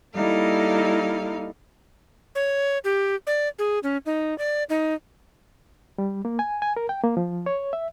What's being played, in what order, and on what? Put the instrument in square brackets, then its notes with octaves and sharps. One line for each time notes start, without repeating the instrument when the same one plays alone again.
[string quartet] G3 A#3 D#4 E4 A4 F5
[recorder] C#5
G4
D5
G#4
C#4
D#4
D5
D#4
[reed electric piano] G3
A#3
G#5
G#5
A#4
G5
A#3
F3
C#5
E5